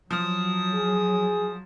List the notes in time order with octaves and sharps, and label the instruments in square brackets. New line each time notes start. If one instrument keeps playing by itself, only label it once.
[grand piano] F3 F6 [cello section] F#3 [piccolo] D#6
[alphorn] G#4